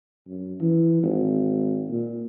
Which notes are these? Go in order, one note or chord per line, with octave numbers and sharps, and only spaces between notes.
F#2
E3
G#1
A#2